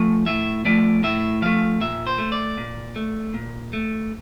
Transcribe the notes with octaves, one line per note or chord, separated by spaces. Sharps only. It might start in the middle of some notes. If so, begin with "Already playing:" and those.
Already playing: F3 A3
A2 E5
F3 A3 D5
A2 E5
F3 A3 F5
A#2 E5
C5
A3
D5
A#2
A3
A#2
A3